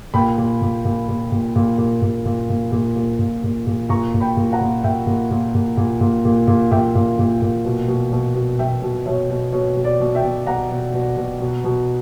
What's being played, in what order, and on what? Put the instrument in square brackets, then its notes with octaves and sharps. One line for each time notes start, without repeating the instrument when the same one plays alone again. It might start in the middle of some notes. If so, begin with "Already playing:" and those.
[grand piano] A#2 G5 B5
A#2
A#2
A#2
A#2
A#2
A#2
A#2
A#2
A#2
A#2
A#2
A#2
A#2
A#2
A#2
A#2 A#5 C#6
A#2
G5 B5
A#2
F#5 A#5
A#2
A#2 E5 G5
A#2
A#2
A#2
A#2
A#2
A#2
A#2
A#2 E5 G5
A#2
A#2
A#2
B2
B2
B2
B2
B2 E5 G5
B2
B2 C#5 E5
B2
B2 C#5
B2
D5
B2
E5 G5
B2
B2 F#5 A#5
B2
B2
B2
B2
B2